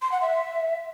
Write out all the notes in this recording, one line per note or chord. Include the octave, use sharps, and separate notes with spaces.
C6
F#5
E5